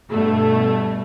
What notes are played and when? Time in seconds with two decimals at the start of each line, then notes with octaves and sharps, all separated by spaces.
0.11 G2 B2 A3